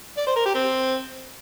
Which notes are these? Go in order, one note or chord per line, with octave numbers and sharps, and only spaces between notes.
D5
C5
A#4
G4
C4